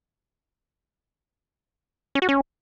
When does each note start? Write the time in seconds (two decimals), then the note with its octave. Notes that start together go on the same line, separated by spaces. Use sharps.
2.15 C#4
2.22 F#4
2.29 C#4